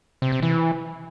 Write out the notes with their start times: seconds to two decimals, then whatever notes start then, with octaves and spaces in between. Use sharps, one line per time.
0.22 C3
0.32 C3
0.42 E3